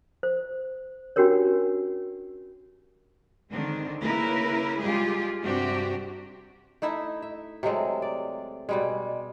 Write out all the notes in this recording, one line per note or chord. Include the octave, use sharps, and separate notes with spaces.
C5
C#4 D4 F#4 G4 A#4 C#5
D3 D#3 G#3 C4 D4
C#3 A#3 E4 A#4 B4
G3 G#3 F4 G4 G#4
G2 C3 D4 F#4 G4
A3 D#4 E4 E5
E5
C3 F#3 G#3 A3
D5
B2 G3 G#3